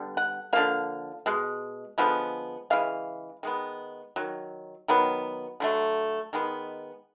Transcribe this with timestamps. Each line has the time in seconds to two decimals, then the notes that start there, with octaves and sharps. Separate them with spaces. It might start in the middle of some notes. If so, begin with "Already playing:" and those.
Already playing: D3 G3 B3
0.17 F#5
0.53 D3 F3 A#3 F5
1.26 B2 G#3
1.98 D3 F3 G#3 B3
2.70 C#3 E3 G#3 F5
3.43 D#3 G#3 B3
4.16 D#3 F#3
4.88 D#3 F#3 B3
5.60 D3 F#3 A3
6.33 D#3 G#3 B3